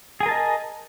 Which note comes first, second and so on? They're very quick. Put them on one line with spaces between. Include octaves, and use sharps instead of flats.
G#4 G#5 A#4 A5 D#5